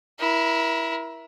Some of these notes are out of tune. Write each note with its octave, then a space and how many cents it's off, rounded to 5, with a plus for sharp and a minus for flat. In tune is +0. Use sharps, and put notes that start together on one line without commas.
E4 +0 A#4 +35